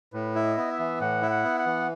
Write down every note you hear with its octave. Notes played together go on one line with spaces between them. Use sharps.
A2 B4
E4
D#5
B3
E5
E3
A2 F#5
E4
F#5
B3
F#5
E3